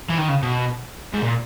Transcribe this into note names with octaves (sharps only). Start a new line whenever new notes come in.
E3
D#3
C#3
B2
G#2
A#2